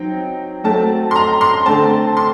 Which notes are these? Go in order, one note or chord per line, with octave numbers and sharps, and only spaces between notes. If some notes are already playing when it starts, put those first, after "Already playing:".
Already playing: F#3 C4 D#4 G5
F#3 A3 C4 A5
C6
A#5
C6
D3 A3 C4 A5
C6